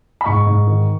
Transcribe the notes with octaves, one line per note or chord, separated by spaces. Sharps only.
B5
G#2 C#6
G#2
D#3